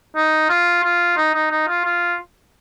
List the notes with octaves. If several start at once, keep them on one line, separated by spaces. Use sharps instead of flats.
D#4
F4
F4
D#4
D#4
D#4
F4
F4